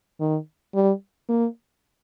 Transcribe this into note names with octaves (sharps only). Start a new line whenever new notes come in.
D#3
G3
A#3